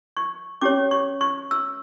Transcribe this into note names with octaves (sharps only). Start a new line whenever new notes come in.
C#6
C#4 G4 C#5 D6
C#6
C#6
E6